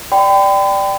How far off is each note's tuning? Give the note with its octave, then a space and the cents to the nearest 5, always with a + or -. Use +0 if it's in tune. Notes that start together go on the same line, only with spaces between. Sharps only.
D5 +0 G5 +0 B5 +45